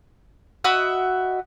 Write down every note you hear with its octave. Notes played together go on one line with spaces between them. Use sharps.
F#4 D#5 E5 B5